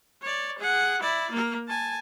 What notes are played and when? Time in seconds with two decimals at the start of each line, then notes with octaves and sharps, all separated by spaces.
0.22 C#5 D5
0.59 G#4 F#5
1.02 E4 D5
1.31 A#3 A#4
1.68 G#5 A5